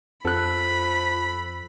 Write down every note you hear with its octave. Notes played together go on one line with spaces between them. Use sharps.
F2 F3 A4 B5 F#6